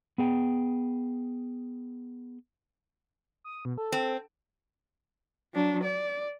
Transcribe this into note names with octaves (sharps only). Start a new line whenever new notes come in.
B3 G#4 G5
D#6
B2
A4
C4
F#3 D4
D5